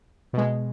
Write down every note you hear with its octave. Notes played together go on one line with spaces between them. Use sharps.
B2 G#3